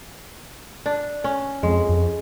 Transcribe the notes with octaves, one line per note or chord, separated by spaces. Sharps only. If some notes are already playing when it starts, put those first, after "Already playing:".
D4
C#4
F2 G#3
F2